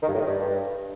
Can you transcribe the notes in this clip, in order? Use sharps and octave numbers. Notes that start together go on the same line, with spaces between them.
D#3
G2
A2
D#3
G2